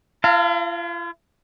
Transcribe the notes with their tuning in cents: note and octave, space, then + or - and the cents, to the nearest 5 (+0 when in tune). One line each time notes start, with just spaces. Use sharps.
F4 -45 F5 +0 A5 +45